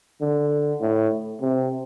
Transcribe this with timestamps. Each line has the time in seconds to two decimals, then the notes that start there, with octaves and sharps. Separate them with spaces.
0.21 D3
0.81 A2
1.42 C3